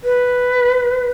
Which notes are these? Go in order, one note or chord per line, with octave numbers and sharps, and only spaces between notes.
B4